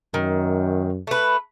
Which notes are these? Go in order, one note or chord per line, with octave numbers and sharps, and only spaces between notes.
F#2 D#3
A3 B4